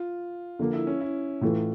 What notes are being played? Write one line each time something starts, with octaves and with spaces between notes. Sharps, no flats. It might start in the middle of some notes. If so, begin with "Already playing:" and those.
Already playing: F4
D3 F3 A#3
E4
C#4
E4
A2 E3 A3 F4